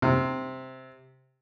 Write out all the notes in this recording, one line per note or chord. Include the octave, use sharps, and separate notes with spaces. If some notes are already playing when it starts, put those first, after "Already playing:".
C3